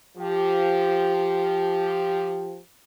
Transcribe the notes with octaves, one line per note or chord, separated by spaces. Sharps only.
F3 G4